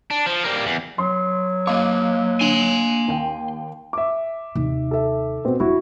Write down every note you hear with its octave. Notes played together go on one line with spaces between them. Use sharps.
D4
F3
G3 A#3
E2
F#3 C6
A#3 C#5 D#5 F5 D6
D3 G#5 C6
D#2 G5
E5 D6
D#2 C3
A4 E5
B2 C4
E1 E4 F#4